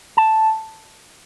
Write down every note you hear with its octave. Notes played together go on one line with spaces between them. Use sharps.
A5